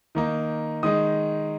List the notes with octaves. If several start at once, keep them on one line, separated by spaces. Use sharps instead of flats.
D#3 A#3 D#4
D#3 G#3 D#4 D#6